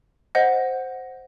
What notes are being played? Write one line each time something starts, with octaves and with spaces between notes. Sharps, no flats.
C5 D#5 F#5